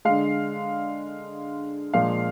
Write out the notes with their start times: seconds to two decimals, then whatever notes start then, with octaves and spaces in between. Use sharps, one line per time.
0.05 D3 G#3 F5
1.94 A#2 F3 G#3 F5